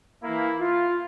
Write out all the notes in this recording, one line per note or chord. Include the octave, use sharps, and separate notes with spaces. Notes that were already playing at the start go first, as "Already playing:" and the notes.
E3 A#3 E4
F4